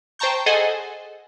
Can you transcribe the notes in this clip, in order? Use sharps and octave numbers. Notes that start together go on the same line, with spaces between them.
C5 G5 A5 A#5 C#6 G6
G#4 A4 C5 D#5 F#5 G#5